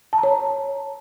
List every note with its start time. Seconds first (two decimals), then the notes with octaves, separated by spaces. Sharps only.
0.13 A5
0.18 A#5
0.23 C#5